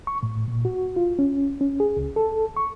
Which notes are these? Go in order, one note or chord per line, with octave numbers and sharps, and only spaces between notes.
C#6
A2
A#2
F#4
F4
C#4
C#4
G#4
C#2
A4
C#6